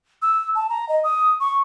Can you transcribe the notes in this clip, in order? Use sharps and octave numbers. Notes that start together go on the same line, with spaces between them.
E6
A5
A#5
D#5
D#6
C#6